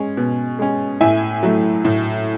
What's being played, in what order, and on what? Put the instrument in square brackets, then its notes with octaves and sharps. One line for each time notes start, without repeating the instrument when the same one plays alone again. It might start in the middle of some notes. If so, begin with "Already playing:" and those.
Already playing: [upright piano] G#3 C#4
B2
G#3 C#4
A2 E5 G#5
F#3 A3
A2